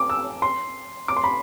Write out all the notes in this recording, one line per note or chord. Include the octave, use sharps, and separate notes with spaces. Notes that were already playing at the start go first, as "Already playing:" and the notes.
Already playing: D6
E6
C6
D6
C6
B5